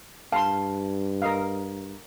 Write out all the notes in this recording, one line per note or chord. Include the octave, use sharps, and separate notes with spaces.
G2 F5 A5 C6
A#4 D#5 F5